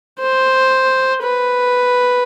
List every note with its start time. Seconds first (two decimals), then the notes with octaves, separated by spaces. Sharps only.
0.19 C5
1.23 B4